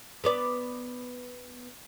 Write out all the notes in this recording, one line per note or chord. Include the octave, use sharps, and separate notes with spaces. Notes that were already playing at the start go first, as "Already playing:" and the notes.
B3 B4 D5